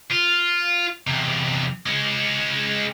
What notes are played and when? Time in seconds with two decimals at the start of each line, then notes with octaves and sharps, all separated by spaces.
0.11 F4
1.07 E2 C3
1.86 G#3 C#4